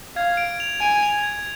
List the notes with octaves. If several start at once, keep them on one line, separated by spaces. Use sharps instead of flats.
F5 G#6
D7
F7
G#5 D7
F7
G#6